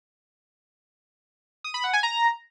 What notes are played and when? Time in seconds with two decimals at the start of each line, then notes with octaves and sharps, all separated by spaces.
1.64 D#6
1.74 B5
1.84 F#5
1.93 G#5
2.03 A#5